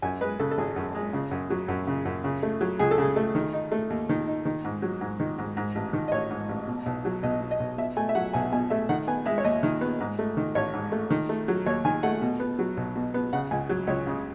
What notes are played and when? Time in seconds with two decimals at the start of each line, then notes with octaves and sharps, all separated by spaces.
0.02 F#2 G#5
0.21 G#3 B4
0.39 C#3 A4
0.51 A4
0.58 G#1 G#4
0.76 F#2
0.95 G#3
1.13 C#3
1.31 F#2
1.50 F#3
1.68 F#2
1.87 C#3
2.05 F#2
2.24 C#3
2.43 A3
2.61 F#3
2.79 C#2 G#4
2.91 A4
2.98 C#3 G#4
3.16 A3
3.35 D#3
3.53 D#4
3.72 A3
3.90 D#2
4.09 D#3
4.27 D#4
4.45 D#3
4.64 G#2
4.82 F#3
5.01 G#2
5.20 D#3
5.38 G#2
5.57 G#2
5.75 A1
5.93 D#3
6.08 D#5
6.12 A1 C#5
6.30 G#2
6.49 A1
6.68 B2
6.86 B1
7.05 F#3
7.23 B1 D#5
7.41 B2
7.51 D#5
7.60 B1
7.78 B2 E5
7.97 A3 G#5
8.09 E5
8.15 F#3 F#5
8.33 B1 G#5
8.52 B2 G#5
8.70 A3 E5
8.89 D#3 F#5
9.07 B3 G#5
9.26 G#3 E5
9.38 C#5
9.44 D#2 D#5
9.63 D#3
9.81 B3
10.00 G#2
10.19 A3
10.37 D#3
10.55 A1 C#5
10.73 G#2
10.92 A3
11.10 D#3
11.29 A3
11.48 F#3
11.66 D#2 C#5
11.85 D#3 G#5
12.03 A3 F#5
12.22 B2
12.40 B3
12.59 F#3
12.77 B1
12.96 B2
13.14 B3
13.33 C#3 F#5
13.51 C#2 G#5
13.69 F#3
13.87 C#2 C#5
14.07 C#3